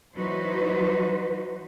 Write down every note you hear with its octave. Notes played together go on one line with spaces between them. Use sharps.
E3 F#3 D#4 F#4 B4 C5